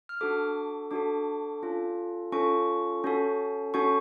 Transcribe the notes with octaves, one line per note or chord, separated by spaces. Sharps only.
F6
D4 F#4 A4 D6
D4 F#4 A4 D6
C#4 F4 A4
C#4 F4 A4 C#6
C#4 F#4 A4
C#4 F#4 A4 C#6